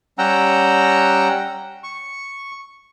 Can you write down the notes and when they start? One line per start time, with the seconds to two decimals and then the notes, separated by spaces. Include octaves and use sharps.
0.18 G3 C#4 F#5 G5 A#5 E6
1.84 C#6